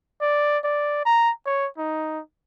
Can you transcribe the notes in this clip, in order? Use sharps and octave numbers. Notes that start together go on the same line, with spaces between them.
D5
D5
A#5
C#5
D#4